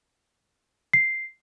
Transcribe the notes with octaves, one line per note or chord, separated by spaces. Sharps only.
C7